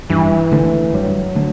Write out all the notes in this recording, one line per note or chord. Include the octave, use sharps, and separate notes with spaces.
G2 E3
D3 A3
G2 F#3
D3 A3